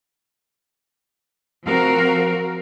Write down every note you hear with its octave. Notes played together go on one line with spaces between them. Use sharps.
F3 C4 F#4 A#4 F5